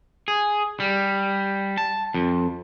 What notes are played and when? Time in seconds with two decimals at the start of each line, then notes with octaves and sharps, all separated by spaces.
0.28 G#4
0.80 G3
1.78 A5
2.14 F2